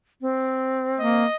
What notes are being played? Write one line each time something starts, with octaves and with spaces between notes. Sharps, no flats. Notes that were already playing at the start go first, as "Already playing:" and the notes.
C4
A#3 D#5